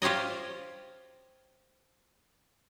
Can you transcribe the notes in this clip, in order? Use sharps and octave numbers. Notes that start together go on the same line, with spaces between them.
F4 G4 C5 C#5 D#5